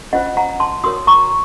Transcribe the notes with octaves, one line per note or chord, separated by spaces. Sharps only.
C#4 F4 C5 D#5 F#5
F#5 A#5
A5 C6
F#4 A#4 C#5 C6 D#6
A#5 C#6